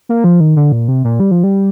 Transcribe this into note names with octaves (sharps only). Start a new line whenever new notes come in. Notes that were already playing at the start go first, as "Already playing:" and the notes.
A#3
F3
D#3
D3
A#2
C3
A#2
G3
F3
G3